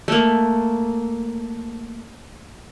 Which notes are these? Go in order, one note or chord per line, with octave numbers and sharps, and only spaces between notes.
A3 A#3